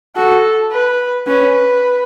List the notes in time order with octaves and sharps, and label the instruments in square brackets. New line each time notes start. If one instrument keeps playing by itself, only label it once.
[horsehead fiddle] F#4 [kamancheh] A4
[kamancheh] B4
[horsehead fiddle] C#4 [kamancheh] B4